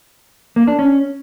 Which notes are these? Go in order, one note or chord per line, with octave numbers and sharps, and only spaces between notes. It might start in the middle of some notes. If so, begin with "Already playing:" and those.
A#3
D4
C#4